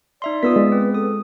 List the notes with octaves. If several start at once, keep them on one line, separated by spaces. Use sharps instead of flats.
D#4 D5 E5 C6
B3 F4 D#6 E6 B6
G#3
C4 B4
A4 D#6